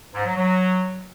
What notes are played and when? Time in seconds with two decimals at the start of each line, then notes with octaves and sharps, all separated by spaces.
0.14 G#2
0.26 F#3
0.37 F#3